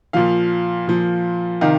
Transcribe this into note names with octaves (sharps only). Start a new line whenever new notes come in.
A#2 F3 F5
A#2 F3
C3 D#3 F5